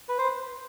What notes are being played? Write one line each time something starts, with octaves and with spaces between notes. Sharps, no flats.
B4
C5